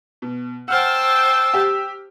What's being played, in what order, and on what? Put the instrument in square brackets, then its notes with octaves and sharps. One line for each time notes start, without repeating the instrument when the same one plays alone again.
[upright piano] B2
[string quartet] C5 G5 A5 [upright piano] F#5 F6 [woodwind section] E6
[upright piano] G4